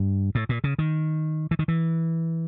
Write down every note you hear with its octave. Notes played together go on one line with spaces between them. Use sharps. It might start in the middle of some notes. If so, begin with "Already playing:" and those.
Already playing: G2
A2
A#2
C#3
D#3
E3
D#3
E3